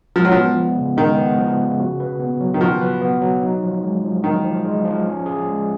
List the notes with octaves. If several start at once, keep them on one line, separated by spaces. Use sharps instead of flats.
F3 G#3
F#3
F3 B3
F3
C#3
D#3 G#3
B3
F3
C#3
F#4
B4
B3
F#3
D#3
F3 F#4
B4
B3
F#3
D#4
F3
G#3
F3
D#3 D#4
F3
G#3
F3
C#4
G#4
G#3